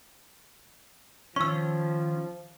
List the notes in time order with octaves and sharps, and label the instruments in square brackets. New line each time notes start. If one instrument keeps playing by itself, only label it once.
[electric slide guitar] D#3 C#4 [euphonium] F3 [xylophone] C#6 E6